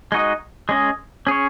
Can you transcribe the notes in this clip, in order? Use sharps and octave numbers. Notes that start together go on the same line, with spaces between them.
G#3 D#4 F#4 D#5
G#3 C#4 G#4 D#5
C#4 G#4 C#5